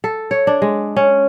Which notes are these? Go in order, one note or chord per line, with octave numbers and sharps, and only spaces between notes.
A4
C#5
D4
G#3
C#4